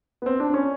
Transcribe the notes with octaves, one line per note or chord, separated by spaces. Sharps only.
B3
C4
D4
C#4